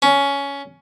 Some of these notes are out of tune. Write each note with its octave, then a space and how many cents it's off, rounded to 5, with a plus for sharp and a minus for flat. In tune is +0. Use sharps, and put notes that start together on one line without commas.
C#4 +15